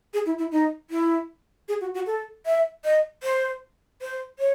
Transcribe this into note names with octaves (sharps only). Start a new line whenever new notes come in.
G#4
E4
E4
D#4
E4
G#4
F#4
F#4
A4
E5
D#5
C5
C5
C#5